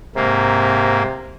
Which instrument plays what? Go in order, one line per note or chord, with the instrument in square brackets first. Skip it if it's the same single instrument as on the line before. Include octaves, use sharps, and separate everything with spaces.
[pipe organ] G#2 A#3 [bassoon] C3